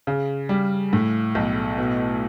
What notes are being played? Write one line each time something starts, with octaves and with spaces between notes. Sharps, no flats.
C#3
G3
A2
B1
B2